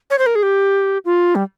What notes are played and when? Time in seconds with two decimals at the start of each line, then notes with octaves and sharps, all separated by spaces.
0.10 C#5
0.18 C5
0.26 A#4
0.35 G#4
0.43 G4
1.05 F4
1.35 G3